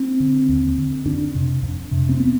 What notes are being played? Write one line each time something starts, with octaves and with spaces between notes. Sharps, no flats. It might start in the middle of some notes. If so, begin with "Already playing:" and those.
Already playing: C4
D3
D#2
D3
F2 D4
C3
F2
C3
C4
B3